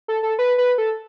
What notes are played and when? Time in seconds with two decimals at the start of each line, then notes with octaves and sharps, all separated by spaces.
0.08 A4
0.23 A4
0.39 B4
0.58 B4
0.78 A4